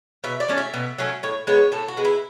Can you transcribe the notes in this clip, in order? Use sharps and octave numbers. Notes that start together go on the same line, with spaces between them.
B2 E5
D5
F#3 A3 C#4
E5
B2
F#3 A3 C#4
A2 C#5
G#3 B3 C#5
A2 A4
F#4
G#3 B3
E4